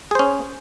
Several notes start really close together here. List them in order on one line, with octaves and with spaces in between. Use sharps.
G#4 C5 C#4